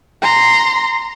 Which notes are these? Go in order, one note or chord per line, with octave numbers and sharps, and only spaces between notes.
A#5 C6